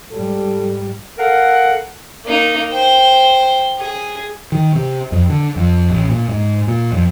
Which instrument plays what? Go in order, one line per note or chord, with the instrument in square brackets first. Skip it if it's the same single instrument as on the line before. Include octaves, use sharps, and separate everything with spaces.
[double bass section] G#2 G3 [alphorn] A4
[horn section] A4 A#4 F5 F#5
[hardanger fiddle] A#3 D#4
C5 G5
G#4
[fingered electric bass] D#3
C3
F2
D3
F2
A1
A#2
G#2
A#2
F2